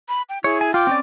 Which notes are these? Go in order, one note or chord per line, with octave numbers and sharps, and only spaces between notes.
B5
G5
E4 G#4 C#5
G#5
F4 G5 D6
C4 C#4 D5